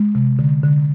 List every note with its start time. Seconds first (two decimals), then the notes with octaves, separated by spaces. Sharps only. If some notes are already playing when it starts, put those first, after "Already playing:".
Already playing: G#3
0.15 C3
0.39 D3
0.63 D3